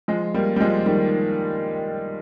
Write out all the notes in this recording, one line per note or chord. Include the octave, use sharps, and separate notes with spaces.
F3 G#3
G3 A#3
G3
F3 G#3
D#3 G3